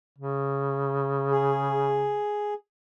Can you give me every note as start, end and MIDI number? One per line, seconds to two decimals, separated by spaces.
0.18 2.19 49
1.31 2.54 68